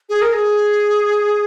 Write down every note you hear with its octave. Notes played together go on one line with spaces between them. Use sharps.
G#4
A#4
G#4